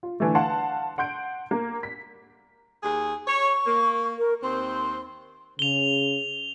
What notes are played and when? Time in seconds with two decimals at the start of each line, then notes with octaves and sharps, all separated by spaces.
0.03 F4
0.20 D3 E3 A3
0.35 F5 F#5 A5 C6
0.98 F#5 C6 G6 D7
1.51 A#3
1.83 B6
2.83 D#2 G#4
3.27 C#5 C#6
3.66 A#3
4.18 A#4
4.43 D#2 C4 C6
5.59 C#3 F7 G7